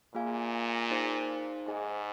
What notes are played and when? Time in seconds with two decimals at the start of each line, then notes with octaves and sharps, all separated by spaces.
0.14 A#2 A#3 F4 G#4 F5 G#5
0.91 D#4 G#4 C5 F5
1.67 G#2 G#4 D#5 G#5